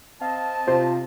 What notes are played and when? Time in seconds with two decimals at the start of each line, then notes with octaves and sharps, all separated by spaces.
0.22 C4 D#5 F5 A5
0.68 C3 F4 C5